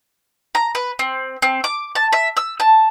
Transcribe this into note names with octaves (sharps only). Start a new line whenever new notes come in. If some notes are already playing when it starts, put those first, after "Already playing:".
A#5
B4
C4
C4
D6
A5
E5
E6
A5